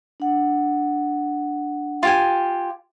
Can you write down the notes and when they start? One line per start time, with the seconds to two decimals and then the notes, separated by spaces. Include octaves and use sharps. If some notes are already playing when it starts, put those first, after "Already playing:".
0.20 D4 F#5
2.03 F4 G4 G#5